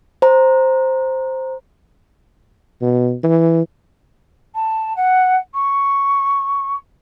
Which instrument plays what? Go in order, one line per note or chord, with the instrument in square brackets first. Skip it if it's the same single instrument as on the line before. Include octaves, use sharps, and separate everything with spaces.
[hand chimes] C5 A#5
[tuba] B2
E3
[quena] A5
F#5
C#6